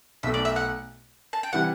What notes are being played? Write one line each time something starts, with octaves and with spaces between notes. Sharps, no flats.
B1 B2 A3 E5
D5
E5
F#5
A5
G5
C3 E3 G3 F#5